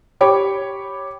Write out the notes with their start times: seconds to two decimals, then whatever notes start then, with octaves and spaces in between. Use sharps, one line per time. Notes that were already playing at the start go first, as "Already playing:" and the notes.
0.21 G4 C#5 B5 D6